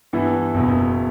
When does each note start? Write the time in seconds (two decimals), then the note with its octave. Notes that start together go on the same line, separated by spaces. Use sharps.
0.13 G2 E3 B3 E4
0.54 F#1 E2 B2